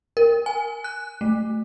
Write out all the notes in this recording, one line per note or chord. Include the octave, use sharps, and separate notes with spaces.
A#4
G#5
F#6
A3